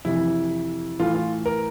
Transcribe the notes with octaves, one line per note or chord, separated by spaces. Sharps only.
F2 C3 E3 E4
A2 E3 A3 F4
F4
A#4